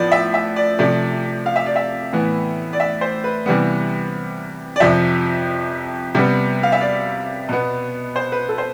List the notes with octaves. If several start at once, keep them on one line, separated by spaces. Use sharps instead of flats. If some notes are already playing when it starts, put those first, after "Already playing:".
Already playing: A2 F3 B3 D5
E5
E5
D5
C3 F3 A3 D5
F5
E5
D5
E5
A2 E3 B3
D5
E5
C5
B4
C3 E3 G3 B3
D5
F2 C3 F3 E5
C3 G3 B3
F5
E5
D5
B2 B3
C5
B4
A4
C5